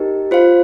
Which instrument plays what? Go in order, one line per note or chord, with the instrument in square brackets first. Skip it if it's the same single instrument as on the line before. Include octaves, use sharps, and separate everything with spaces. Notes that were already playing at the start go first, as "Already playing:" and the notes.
Already playing: [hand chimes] D#4 G4 A#4 D#5
F4 C5 F5